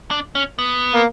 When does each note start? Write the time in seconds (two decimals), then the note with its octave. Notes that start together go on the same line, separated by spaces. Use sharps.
0.11 D4
0.35 C#4
0.59 B3
0.94 A#3